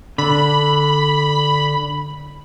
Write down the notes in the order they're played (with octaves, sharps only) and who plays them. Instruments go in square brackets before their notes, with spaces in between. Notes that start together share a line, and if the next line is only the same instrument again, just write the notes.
[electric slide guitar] D3 [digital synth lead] B5